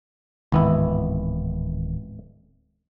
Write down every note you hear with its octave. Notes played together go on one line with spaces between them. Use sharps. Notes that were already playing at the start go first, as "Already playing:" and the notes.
D1 G#1 D#3 E3 B3 E4